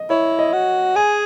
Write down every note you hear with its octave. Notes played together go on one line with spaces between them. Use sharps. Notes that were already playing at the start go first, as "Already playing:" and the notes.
Already playing: D#5
E4 C#5
D#5
F#4
G#4 G#5